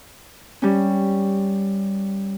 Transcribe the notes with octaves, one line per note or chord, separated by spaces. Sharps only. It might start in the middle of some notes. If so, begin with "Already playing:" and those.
G3 C#4